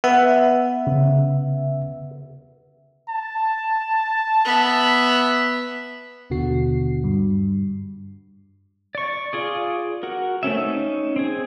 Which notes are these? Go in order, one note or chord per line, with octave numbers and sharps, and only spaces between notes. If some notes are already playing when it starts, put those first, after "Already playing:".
B3 E5
C#3
A5
B3 E5
D#2 B2 D3 F#4 C7
G2
D5 C#6
F4 G#4 D5
F#4 A#4
A3 C4 C#4 E5
C#4 D#4
C4 G#4